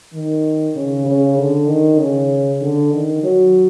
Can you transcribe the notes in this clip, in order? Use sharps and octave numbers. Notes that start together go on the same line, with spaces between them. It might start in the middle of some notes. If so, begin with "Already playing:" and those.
D#3
C#3
C#3
D3
D#3
C#3
D3
D#3
F#3